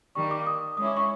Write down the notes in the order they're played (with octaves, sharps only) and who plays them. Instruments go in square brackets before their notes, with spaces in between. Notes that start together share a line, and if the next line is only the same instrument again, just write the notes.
[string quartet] D#3 G3 A#3 [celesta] C#6
[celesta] D6
D6
D#6
[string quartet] G#3 C#4 E4 [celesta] D#6
[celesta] D6
C#6